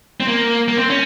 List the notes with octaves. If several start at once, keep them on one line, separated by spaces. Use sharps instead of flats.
C4
A#3
A#3
C4
C#4